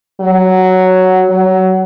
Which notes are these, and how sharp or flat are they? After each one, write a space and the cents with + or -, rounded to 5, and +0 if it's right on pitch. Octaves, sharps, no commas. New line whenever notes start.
F#3 +5
F#3 +20